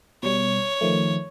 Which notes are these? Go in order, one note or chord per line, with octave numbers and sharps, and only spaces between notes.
B2 G3 C#5
D#3 F3 A3